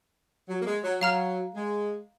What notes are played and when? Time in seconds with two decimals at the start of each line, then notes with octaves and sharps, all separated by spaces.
0.48 F#3
0.62 A#3
0.66 G#3
0.83 F#3
1.01 F#3 F5 A#5 F6
1.55 G#3